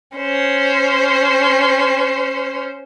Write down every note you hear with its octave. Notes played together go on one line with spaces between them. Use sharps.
C#4 C5